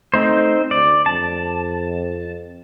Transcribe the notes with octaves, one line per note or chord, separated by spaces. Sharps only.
A3 C4 D#4 C5
D2 D5
F2 A5